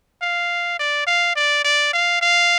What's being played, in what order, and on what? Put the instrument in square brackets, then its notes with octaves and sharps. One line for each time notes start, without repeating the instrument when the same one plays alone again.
[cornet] F5
D5
F5
D5
D5
F5
F5